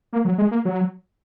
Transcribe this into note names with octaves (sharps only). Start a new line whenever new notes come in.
A#3
F#3
G#3
A#3
F#3